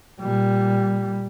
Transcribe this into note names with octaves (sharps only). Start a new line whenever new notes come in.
A#2 G3